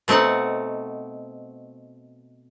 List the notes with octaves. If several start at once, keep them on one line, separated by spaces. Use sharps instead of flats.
B2 A3 C4 D#4 F#5